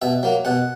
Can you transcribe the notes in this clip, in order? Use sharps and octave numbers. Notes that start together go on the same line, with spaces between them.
B2 E5
F#3 A#3
B2 F#5